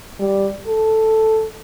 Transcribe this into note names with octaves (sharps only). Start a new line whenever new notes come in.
G3
A4